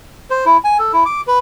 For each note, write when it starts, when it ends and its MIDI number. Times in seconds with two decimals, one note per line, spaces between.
0.30 0.45 72
0.46 0.57 64
0.64 0.77 80
0.79 0.93 69
0.93 1.04 64
1.06 1.21 86
1.27 1.39 71